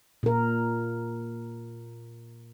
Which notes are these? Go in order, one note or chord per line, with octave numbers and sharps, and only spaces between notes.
A#2 A#4